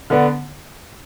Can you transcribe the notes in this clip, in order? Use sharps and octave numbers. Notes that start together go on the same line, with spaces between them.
D3 B3 D4